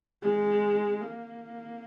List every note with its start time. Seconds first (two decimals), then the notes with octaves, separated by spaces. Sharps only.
0.22 G#3
1.01 A#3